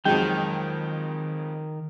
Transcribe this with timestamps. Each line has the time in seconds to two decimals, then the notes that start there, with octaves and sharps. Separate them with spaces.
0.05 F2 D#3 F#3 G#3 G5